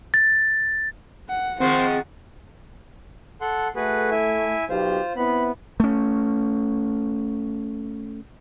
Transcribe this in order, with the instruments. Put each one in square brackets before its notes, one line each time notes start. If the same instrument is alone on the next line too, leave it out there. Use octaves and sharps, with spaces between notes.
[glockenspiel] A6
[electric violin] F#5
[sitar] D#3 F3 G#3 [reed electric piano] C4 [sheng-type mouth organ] C5 [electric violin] F#5
[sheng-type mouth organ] A4 F#5 C6
[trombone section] A3 [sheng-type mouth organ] F#4 G#4 B4
[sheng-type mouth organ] E4 E5 G#5
[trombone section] B1 G4 [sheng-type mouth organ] F4 C5
[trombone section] B3 C4 E4 [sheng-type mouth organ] B5
[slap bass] A3 C#4